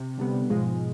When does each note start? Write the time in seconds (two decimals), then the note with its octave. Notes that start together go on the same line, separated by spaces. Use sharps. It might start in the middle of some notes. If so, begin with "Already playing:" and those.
Already playing: C3
0.18 D3 G3 B3
0.50 G#2 B2 F3 G#3